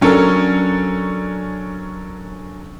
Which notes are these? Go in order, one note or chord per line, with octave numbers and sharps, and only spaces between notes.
F#3 C#4 D4 A4 A#4